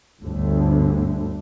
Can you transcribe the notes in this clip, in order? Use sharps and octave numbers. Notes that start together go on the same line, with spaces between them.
G1 D2 D3 A3